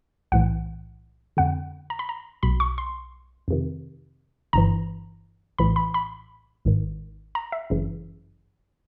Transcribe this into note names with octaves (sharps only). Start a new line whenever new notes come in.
B1 A2 E3 F#5
F2 D3 F#5
A#5
B5
A#5
B1 B2 B5
C#6
C6
F2 C3 D#3
G1 G2 E3 A#5
A#1 A2 E3 B5
B5
B5
G#1 G#2 D#3
A#5
E5
G1 F#2 C#3 E3